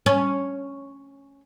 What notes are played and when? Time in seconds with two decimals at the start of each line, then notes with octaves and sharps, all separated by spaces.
0.06 C#4